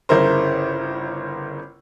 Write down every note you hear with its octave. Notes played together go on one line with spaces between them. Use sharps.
G1 C#3 E4 A#4 C5